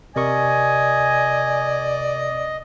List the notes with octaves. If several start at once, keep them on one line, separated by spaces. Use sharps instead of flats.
C3 A#4 D5 D#5 G#5 C#6